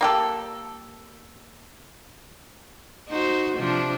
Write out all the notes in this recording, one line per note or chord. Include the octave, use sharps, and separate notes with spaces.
A#3 G4 A4
D#4 F#4 C5
C3 F3 D4